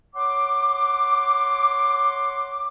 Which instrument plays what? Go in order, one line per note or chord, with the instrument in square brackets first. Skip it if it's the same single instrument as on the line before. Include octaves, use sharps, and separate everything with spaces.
[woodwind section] C#5 F#5 C6 D6